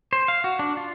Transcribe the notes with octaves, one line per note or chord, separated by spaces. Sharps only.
C5
F5
F#4
D4
F4